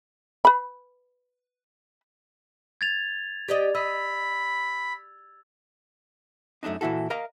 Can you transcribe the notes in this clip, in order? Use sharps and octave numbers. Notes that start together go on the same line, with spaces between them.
B4 B5
G#6 A6 F7
G4 D5 D#5
D#5 B5 E6
F#2 A3 C4 D4 D#4
A#2 E3 E4 F#4 A4
A#4 D#5 F5 A#5